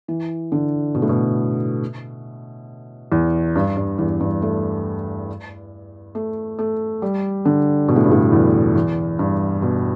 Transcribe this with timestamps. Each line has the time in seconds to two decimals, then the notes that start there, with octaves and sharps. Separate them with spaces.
0.08 E3
0.52 D3
0.95 B2
1.02 A2
1.09 B2
3.12 E2
3.55 G2
3.77 G2
3.98 E2
4.20 G2
4.42 A3
6.15 A3
6.59 A3
7.02 G3
7.45 D3
7.88 B2
7.96 A2
8.04 G2
8.11 A2
8.32 E2
8.75 E2
9.19 G2
9.62 B2